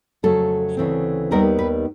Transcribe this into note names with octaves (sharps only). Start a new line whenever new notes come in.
F2 C#3 F#3 A3 A4
D2 C#3 E3 A3 C4
D#2 D#3 G3 B3 D#4 A#4
B4